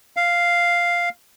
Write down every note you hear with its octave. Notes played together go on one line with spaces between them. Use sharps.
F5